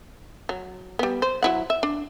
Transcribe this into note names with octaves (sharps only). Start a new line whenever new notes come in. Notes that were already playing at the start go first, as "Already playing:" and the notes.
F#3
G3 B3
C5
F#3 E4 F#5
E5
D4